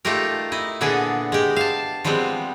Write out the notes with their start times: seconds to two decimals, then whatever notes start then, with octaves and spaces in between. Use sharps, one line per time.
0.05 A3 D#4 F4 G4 A#4
0.52 E4 D#5
0.81 A#2 D3 B3 D4 G#4
1.32 G#3 G4
1.56 F5 A5
2.04 F3 G3 G#3 B3 C4